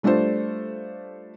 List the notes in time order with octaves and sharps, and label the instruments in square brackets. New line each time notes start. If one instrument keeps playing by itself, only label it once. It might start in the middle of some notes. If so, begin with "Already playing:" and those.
[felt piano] G3 A3 D4 F4 A4 C5